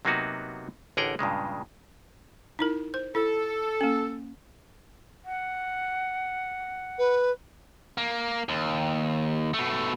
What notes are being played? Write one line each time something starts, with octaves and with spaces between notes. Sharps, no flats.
C3 F#3 A#3 B3 D#4 F#4
A1 D3 G#4 A#4 F#5 G5
G2 A#2 C#3 G#3
D#4 E4 A#4
C5
E4 A4
A#3 C#4
F#5
B4
A#3
D#2
B2 A3